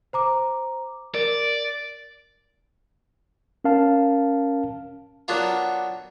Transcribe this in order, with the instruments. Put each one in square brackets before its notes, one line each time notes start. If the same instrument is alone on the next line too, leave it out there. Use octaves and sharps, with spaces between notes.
[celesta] C5 A#5 D6
[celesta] A#4 [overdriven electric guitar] D5
[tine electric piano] C#4 A#4 F5 A5
[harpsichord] F#3 A#3 B3 D4 F4